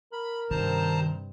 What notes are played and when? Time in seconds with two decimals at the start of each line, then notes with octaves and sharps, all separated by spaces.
0.13 A#4 B5
0.51 G2 C3 D#3 C5 A5 A#5